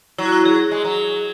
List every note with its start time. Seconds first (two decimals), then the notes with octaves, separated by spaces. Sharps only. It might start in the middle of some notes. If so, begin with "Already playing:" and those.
0.18 F#3 E4
0.26 F#4
0.32 E4
0.45 F#3 G#4
0.71 G#3
0.84 F#3